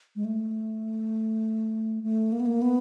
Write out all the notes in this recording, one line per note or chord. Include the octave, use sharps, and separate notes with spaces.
G#3
A3
A3
A#3
B3
A#3
B3